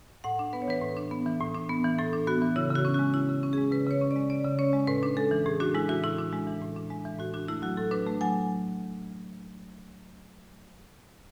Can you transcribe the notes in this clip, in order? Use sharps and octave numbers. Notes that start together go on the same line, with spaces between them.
A2 F#5
D4
B3 B4
C#5
E3 B4
A2
D4
B3
E3
A2
D4
B3
E3
A2 A4
D4
B3 F#4
E3
C#3 E4
C#3 F#4
C#4
G#3 F#4
C#3 E4
C#3
C#4
G#3 G#4
C#3 B4
C#3 C#5
C#4
D5
G#3
C#3 D5
C#3
C#4 C#5
G#3
A2 B4
D4
G#3 A4
E3
A2 G#4
D4 F#4
G#3 E4
E3 F#4
A2 E4
D4
G#3
E3
A2
D4
G#3
E3
A2 F#4
D4 F#4
A3 E4
F#3 F#4
A2 A4
D4 B4
A3
F#3 G#5